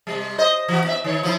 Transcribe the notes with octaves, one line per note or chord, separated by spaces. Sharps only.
C3 G3
C5 D#5
E3 F#4
B3 E5
D#3 C#5
F3 A#3 E4